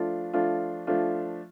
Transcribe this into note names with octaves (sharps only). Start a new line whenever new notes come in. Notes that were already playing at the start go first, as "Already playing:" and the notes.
Already playing: F3 A3 D4 F4
F3 A3 D4 F4
F3 A3 D4 F4